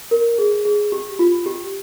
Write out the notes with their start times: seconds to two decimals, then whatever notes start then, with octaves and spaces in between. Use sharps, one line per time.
0.11 A#4
0.39 G#4
0.65 G#4
0.92 G4
1.19 F4
1.46 G4